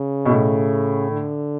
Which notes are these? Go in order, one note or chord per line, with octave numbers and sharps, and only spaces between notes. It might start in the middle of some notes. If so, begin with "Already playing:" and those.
Already playing: C#3
B2
A2
D3